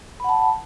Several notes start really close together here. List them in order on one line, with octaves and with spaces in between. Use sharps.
B5 F#5 A5